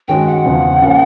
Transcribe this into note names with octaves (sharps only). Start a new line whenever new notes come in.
G2 D#3 G#3 C#4 F#4 G5
F#5
E2 C#3 F3
C#3 F3 A#3 C#4